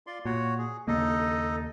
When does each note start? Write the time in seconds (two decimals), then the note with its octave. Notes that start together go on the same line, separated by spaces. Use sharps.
0.07 F4 D5 C6
0.25 A#2 F#4 C#5
0.58 G#4
0.88 D#2 C#3 A#3 D#4 A4 D#5